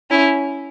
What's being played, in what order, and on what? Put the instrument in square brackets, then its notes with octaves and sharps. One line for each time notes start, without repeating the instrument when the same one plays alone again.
[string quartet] C#4 E4